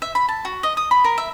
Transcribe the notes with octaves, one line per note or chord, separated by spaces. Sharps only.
E5
B5
A5
F#4
D#5
D#6
B5
A#4
E5